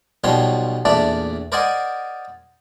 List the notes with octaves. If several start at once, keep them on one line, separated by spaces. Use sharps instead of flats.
B1 B2 F3 G3 C#5 C6
E2 A#2 A3 D4 D5
A#4 C5 D5 D#5 F#5 G#5